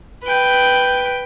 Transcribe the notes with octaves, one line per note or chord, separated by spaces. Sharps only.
B4 G5